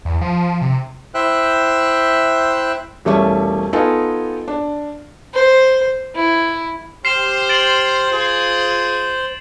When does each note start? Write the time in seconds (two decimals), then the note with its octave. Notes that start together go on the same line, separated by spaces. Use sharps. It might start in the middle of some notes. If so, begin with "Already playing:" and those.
0.05 E2
0.21 F3
0.62 C3
1.14 E4 C5 E5 G5 E6 F#6
3.05 E1 G3 A3 C#4 E5 C#6
3.73 B3 D#4 F4 A4 G#5
4.48 D4
5.34 C5
6.15 E4
7.05 G4 C5 C6 F6 C7 E7
7.49 A6 D7 F#7
8.10 F4 G#4 C5